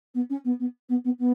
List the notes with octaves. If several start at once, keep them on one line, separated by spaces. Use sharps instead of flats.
B3
C#4
B3
B3
B3
B3
B3